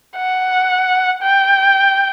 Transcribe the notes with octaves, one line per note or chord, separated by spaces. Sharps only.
F#5
G5